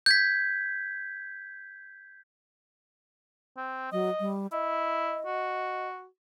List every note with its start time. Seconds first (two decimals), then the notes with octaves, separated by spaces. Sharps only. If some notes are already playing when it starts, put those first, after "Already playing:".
0.06 G6 G#6 B6
3.57 C4
3.92 F#3 D#5
4.20 G3
4.52 E4 D#5
5.26 F#4